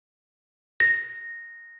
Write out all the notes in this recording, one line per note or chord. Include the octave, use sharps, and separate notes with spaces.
A#6